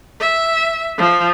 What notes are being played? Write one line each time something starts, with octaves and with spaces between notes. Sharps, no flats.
E5
F3